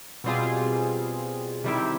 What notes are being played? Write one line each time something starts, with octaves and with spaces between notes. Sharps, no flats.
B2 G3 C4 F4 G#4
C3 D#3 G3 C4 E4